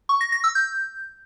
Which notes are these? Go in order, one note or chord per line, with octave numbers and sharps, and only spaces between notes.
C#6
A#6
A#6
E6
G6